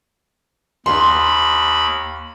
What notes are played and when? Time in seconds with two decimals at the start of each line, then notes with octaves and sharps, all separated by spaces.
0.86 D#2 B5 C6